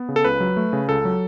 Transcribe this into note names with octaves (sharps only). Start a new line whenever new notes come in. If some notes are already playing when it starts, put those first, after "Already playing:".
Already playing: B3
C#3
A4
C#2 B4
F#3
A3
C#3
C#2 A4
F#3